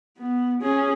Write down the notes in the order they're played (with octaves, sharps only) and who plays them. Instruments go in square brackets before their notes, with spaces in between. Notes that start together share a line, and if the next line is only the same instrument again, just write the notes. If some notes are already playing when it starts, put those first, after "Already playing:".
[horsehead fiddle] B3
C#4 G#4